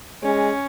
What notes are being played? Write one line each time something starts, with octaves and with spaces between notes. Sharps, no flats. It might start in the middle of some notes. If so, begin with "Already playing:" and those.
G#3 C#4